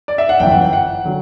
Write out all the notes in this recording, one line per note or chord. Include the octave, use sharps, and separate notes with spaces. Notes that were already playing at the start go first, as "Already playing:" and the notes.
D5
E5
F#5
G1 F#2 E3 G5
F#5
G5
F#5
D3 F#3